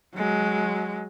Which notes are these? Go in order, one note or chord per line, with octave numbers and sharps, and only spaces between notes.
F#3 G#3